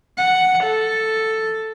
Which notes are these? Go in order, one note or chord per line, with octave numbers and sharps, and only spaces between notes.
F#5
A4